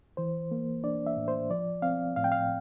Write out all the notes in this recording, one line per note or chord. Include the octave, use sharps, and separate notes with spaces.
E3 C5
A#3
D4 D5
E5
A2
C5
F3 D5
C4 F5
A2 F5
G5
F5